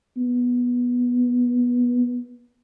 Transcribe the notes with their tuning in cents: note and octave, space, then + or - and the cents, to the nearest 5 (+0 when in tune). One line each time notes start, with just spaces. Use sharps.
B3 -15